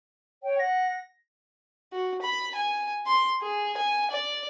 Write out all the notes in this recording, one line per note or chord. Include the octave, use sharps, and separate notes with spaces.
C#5 G5
F#5 A#6
F#4
B5
G#5
C6
G#4
G#5
D5